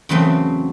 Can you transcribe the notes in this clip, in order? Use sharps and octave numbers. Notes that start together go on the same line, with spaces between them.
E2 C#3 F#3 A3 C4